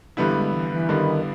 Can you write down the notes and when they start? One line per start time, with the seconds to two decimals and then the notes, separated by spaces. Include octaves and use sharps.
0.17 G2 D3 E3 G3 B3 E4
0.34 G#3
0.53 E3
0.71 E3
0.89 G2 D3 D#3 G3 B3 E4